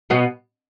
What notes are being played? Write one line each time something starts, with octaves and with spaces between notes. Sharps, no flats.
B2 B3